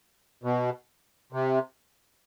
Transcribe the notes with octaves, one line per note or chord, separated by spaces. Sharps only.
B2
C3